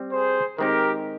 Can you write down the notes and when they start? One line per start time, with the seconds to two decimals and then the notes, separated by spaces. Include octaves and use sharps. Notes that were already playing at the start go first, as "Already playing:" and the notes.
Already playing: G3 C4
0.12 G#4 C5
0.58 D#3 G#3 C4 D#4 G4 A#4